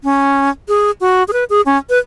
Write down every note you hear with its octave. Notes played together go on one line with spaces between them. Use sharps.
C#4
G#4
F#4
G#4
B4
G#4
C#4
B4